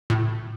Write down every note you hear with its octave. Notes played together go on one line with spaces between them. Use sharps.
A2